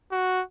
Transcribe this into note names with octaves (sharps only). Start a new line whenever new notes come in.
F#4